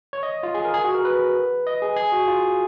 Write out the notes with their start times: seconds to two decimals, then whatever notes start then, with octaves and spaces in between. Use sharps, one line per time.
0.13 C#5
0.23 D#5
0.43 F4
0.54 G#4
0.65 A#4
0.74 G#4
0.84 F#4
0.95 A#4
1.05 B4
1.67 D#5
1.82 G#4
1.96 G#4
2.12 F#4
2.28 F4